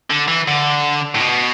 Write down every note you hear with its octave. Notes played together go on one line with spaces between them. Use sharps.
D3
E3
D3
A2
B2